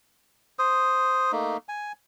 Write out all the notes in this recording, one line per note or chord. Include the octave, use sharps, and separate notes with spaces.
C5 D#6
A3 A#3 D#4
G#5